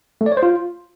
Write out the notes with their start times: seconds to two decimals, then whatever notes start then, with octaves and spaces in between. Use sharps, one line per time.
0.21 A3
0.26 D5
0.32 C#5
0.37 C5
0.43 F4